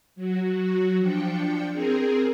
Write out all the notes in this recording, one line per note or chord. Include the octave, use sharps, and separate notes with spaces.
F#3 F#4
F3 D4 G5 C#7
C4 G#4 A#4